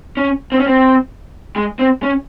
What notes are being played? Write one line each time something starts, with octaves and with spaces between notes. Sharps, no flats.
C#4
C4
C#4
C4
G#3
C4
C#4